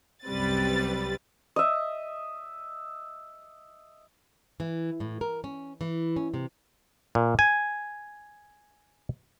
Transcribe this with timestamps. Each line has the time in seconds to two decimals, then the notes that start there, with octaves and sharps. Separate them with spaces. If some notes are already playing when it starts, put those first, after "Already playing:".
0.25 C2 F#2 G3 C4 B4 A6
1.56 D#5 E5
4.60 E3
5.00 A2
5.21 A#4
5.44 C#4
5.81 E3
6.16 C#4
6.34 C3
7.15 A#2
7.39 G#5